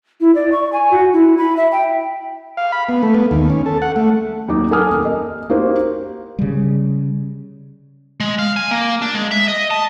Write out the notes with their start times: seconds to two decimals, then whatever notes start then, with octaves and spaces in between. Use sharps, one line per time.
0.20 E4
0.35 D5
0.52 C#6
0.72 G#5
0.91 F#4
1.13 E4
1.38 B5
1.57 E5
1.72 G5
2.57 F5
2.72 B5
2.89 B3
3.03 A3
3.15 B3
3.31 D#2
3.50 C#4
3.66 A4
3.82 F#5
3.96 A3
4.48 D#2 F#3 D#4 D6
4.71 A4 A#4 G#5 D6 D#6 F6
4.91 D#2
5.05 D#5
5.50 A#3 D#4 F#4 G4 C5
6.39 C#3 G3
8.20 G#3
8.39 F5
8.57 G#5
8.71 A#3
9.02 D4
9.14 G#3
9.31 E5
9.48 D#5
9.71 A5